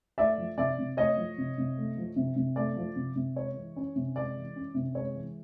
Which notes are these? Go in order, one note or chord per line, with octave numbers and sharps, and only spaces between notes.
A3 D5 E5
F3
C3 D5 E5
C3
A3 C#5 D#5
F3
C3
C3
A3
F3
C3
C3
A3 D5
F3
C3
C3
G#3 C#5
E3
C#4
C3
G#3 D5
E3
C#4
C3
G#3 C#5
E3